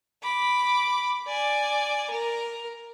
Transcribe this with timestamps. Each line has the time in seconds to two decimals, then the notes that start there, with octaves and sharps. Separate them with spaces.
0.23 B5 D6
1.27 D5 G#5
2.10 A#4